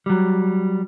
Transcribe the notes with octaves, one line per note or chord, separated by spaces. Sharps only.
F#3 G3